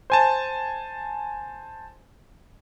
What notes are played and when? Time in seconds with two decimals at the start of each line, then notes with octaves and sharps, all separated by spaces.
0.10 C5 G#5 A5